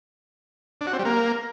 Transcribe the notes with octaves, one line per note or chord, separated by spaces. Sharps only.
D4
F#4
C4
G3
A#3